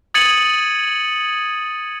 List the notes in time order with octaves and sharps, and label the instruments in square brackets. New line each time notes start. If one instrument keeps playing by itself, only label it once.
[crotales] D#6 G#6 A6 C#7 D#7 F#7